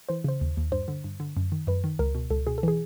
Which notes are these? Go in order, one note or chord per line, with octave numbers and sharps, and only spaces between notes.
E3 C5
C#3 C5
D#2
D#2
G2 C5
D3
G2
D3
F#2
D#3
F#2 B4
D#3
C#2 A#4
B2
C#2 A4
B2 G#4
A4
E3 G#4